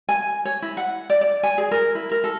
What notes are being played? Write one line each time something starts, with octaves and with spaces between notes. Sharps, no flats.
G#5
C#5
E4
F#5
D5
D5
G#5
G#4
A#4
E4
A#4
A4